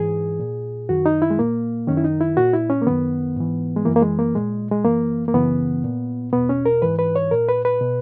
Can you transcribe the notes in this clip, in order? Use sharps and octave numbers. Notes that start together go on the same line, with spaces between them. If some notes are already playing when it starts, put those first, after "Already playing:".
Already playing: G#2 E3 G#4
A#2
F#2 D#3 F#4
D#4
E4
G#3
A#2 A#3
F#2 D#3 C#4
E4
D#4
E4
A#2 F#4
E4
C#4
A#3
F#2 D#3 B3
G#2 E3
G#3
F#2 E3 A#3
A#3
G#3
A#3
A#2 G#3
G#3
F#2 E3 A#3
A#3
F#2 C#3 E3 B3
A#2
E2 B2 B3
C#4
A#4
G#2 E3 B4
B4
C#5
A#2 A#4
B4
B4
B2